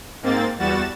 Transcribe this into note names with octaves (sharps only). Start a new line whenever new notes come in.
G#2 A#3 C4 A6
E2 G3 F#4 A6 E7